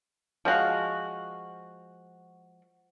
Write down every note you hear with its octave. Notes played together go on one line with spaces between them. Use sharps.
F3 G#3 F#4 F5